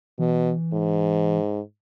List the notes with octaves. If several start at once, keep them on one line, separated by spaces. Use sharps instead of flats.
B2 E3
G#2